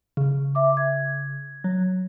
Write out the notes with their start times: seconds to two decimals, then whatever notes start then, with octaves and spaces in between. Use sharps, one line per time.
0.17 C#3
0.55 E5 D6
0.77 G#6
1.64 F#3